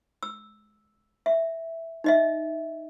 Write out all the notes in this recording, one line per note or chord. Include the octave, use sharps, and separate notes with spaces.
E6
E5
D#4 D#5 E5